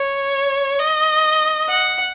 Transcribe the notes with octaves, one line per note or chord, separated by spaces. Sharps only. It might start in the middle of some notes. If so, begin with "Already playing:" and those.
Already playing: C#5
D#5
F#5